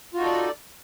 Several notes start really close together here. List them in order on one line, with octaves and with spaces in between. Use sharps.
F4 F#4 D#4 A4 D5